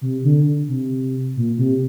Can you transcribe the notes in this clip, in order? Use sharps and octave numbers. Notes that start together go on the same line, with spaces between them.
C3
D3
C3
A#2
C3